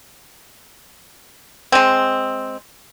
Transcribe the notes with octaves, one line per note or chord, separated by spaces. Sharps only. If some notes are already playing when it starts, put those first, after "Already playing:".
G#3 C4